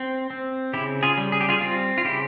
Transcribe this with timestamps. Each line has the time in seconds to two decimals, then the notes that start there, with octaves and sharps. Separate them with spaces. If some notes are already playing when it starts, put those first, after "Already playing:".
Already playing: C4
0.30 C4
0.73 C#3 E4 G4
1.03 F4 G#4
1.18 G3
1.32 G#4
1.41 G4
1.49 F4 G#4
1.61 C4 F4
1.98 F4
2.04 C#3 E4 G4